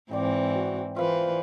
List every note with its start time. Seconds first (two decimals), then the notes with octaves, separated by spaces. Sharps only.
0.11 G#2 E3 C4 D5 G5
0.53 F#4
0.96 E3 F4 B4 C5 F5